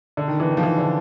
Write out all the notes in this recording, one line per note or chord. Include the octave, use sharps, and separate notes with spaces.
D3
D#3
E3
D#3
F3
E3
D3